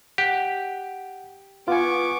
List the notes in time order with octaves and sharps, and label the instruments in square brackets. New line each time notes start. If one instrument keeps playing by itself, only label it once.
[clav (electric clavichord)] G4 [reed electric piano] F#5
[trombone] B3 [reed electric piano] F4 G#5 [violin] C#6 D6